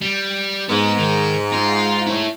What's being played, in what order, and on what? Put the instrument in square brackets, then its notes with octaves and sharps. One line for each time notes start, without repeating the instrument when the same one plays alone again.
[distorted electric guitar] G3
[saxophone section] G#2 [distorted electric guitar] B3
[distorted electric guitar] D#3
F4
E4 C#5